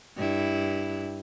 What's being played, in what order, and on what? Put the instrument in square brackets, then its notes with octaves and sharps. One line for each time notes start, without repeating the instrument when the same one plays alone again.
[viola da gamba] G2 E4